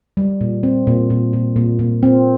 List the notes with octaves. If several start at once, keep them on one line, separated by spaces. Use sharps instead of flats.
G3
A#2
C4
A#2
A#2
A#2
A#2
A#2
C4